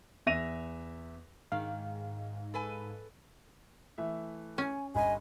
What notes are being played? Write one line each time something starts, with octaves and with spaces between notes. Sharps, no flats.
E2 E5 A#6 D#7 F7
G#2 D#3 F5
A4 B4 G#5
E3 A3 E5
C#4 G#5
G1 G3 D#5 G#5 B5